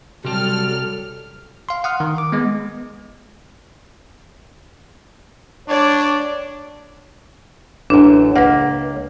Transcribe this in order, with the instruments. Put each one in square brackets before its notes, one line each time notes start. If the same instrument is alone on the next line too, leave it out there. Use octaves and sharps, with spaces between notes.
[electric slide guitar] C3 G4 [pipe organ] F#3 G3 [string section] A4 F6
[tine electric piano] F5 C6
F#5 D#6 F6
D#3
D6
G#3 B3
[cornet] D4 [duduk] C#5 [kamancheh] D5
[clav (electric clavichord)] A1 F#2 [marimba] D4
[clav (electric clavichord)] C#2 A#3 [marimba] B4 F#5